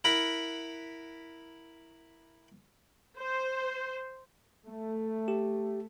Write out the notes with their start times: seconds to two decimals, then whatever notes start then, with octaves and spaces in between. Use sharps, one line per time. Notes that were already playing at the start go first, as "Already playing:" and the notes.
0.04 E4 A#4 F#5 B5
3.17 C5
4.66 A3
5.28 G4